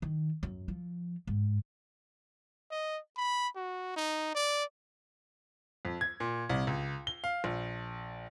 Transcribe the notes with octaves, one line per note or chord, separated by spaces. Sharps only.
D#3
F#2
F3
G#2
D#5
B5
F#4
D#4
D5
F2
G#6
A#2
C2
C#2
G7
F5
A#1